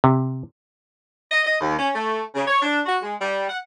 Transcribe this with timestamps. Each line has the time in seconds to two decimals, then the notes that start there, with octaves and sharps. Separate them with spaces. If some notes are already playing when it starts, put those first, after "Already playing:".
0.04 C3
1.32 D#5
1.45 D#5
1.61 D#2
1.79 C#4
1.96 A3
2.35 C#3
2.47 C#5
2.63 D4
2.86 F#4
3.02 G#3
3.22 G3
3.49 F#5